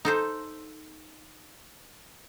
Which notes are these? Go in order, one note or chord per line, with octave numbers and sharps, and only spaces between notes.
D#4 A4 C5